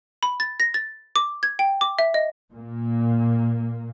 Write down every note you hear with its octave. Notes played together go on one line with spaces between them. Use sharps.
B5
A6
A#6
A6
D6
G#6
G5
D6
E5
D#5
A#2 A#3